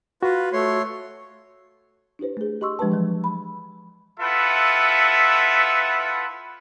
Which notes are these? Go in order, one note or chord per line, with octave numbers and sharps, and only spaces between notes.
F4 F#4 B4
A3 C#5 C6
D4 E4 G4 B4 C5
A3 G#4
G4 D#5 C6 C#6 E6
F3 G#3 D4 G4 B4 A5
E3 F#3
B5
E4 F4 A4 B4 E5 F#5